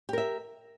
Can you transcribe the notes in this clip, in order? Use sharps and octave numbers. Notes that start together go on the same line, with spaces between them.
G4 A#4 E5